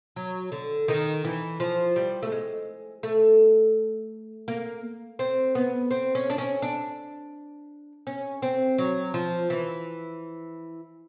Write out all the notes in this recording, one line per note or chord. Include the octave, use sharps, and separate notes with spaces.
F#3
D3
D#3
E3
F3
G3
A3
G#3
A3
A#3
C4
B3
C4
C#4
D4
C#4
D4
C#4
C4
F#3
F3
E3